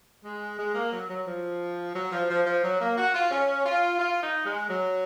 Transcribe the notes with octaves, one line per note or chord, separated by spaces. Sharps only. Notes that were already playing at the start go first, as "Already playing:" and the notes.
G#3
G#3
A#3
F#3
F#3
F3
F#3
F3
F3
F3
F#3
A#3
F#4
F4
C#4
F4
F4
D#4
G#3
F#3